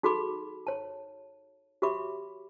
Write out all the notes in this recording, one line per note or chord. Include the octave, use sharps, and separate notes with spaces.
D#4 F#4 G#4 A4 B5 D6
C#5 A5
F#4 G4 C#5 E5 B5 D6